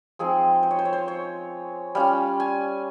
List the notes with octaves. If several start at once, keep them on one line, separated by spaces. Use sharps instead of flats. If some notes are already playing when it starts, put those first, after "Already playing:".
F3 G#3 C4 D#4 G#4
C5
C#5
C5
C#5
C5
C#5
G3 C#4 F4 F5
G#5